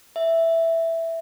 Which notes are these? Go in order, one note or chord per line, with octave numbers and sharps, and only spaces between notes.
E5